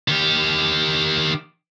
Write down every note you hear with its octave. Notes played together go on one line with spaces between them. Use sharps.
D#3 G4